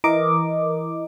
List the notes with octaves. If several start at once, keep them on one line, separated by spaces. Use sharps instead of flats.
E3 A#4 D#5 D6